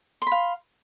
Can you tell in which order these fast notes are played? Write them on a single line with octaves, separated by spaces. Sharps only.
C6 B5 F5